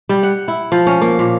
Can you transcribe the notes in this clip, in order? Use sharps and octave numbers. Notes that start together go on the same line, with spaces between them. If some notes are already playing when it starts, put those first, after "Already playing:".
G3
F#5
E4
F3
C#4
A#3
A#2